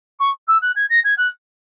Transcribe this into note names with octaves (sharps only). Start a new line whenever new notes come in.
C#6
E6
F#6
G#6
A#6
G#6
F#6